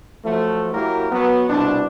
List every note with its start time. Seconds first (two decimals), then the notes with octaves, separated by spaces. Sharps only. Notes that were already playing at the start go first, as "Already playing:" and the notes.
0.25 F3 F#3 A3
0.73 F#3 A#3 E4 G4 A#4
1.12 F#3 B3
1.49 C2 B2 D4